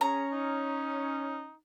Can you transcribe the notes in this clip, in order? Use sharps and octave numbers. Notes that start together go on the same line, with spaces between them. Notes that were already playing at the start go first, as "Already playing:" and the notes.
C#4 G#4 A#5
D#4